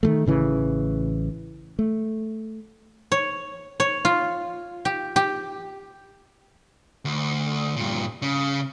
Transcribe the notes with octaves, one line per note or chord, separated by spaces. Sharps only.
D#3 F3 A3
A1 C#3 E3
A3
C#5
C#5
F4
G4
G4
D2
G2 A#2
C#3